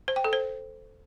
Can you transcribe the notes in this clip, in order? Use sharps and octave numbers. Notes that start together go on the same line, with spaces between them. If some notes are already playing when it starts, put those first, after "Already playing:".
C5
G5
A4
C5